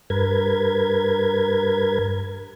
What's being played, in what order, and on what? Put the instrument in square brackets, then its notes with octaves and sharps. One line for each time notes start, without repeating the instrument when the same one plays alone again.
[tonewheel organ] G2 A#4 B4 G#6